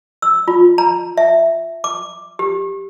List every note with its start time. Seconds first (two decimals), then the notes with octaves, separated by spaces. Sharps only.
0.22 E6
0.48 F4
0.78 A#5
1.17 E5
1.84 D6
2.39 G4